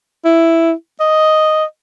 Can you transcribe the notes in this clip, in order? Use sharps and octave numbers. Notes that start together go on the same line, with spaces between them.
E4
D#5